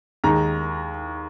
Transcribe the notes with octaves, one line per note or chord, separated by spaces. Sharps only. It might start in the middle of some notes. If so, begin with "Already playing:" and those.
D#2 D#3 G#3 D#4 A#5